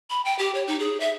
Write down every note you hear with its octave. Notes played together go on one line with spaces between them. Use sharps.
B5
G5
G4
C#5
D#4
G#4
E5